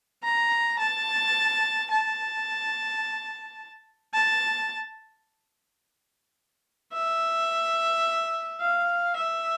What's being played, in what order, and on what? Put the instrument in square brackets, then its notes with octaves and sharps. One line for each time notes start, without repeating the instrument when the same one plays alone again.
[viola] A#5
A5
A5
A5
E5
F5
E5